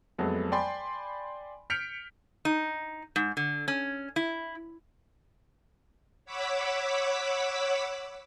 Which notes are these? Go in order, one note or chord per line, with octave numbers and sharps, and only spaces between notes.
F2 F#3 G#3 A3 B3
D5 G5 G#5 B5 C6
F6 G6 B6 C#7 D7 F7
D#4
G#2
D3
C#4
E4
C#5 F#5 B5 D6 E6 B6